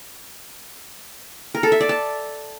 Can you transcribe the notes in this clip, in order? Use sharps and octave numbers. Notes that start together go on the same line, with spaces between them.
A#4
A4
E5
D5
A5